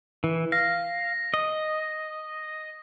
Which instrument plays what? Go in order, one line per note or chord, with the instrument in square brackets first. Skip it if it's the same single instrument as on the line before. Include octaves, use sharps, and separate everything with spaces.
[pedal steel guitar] E3
[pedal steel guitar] F5 [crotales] A#6
[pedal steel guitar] D#5